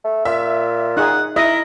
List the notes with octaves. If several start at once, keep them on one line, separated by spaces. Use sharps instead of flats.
A3
A#2 E5
D#4 G#4 F#5
E4 A#4 D#5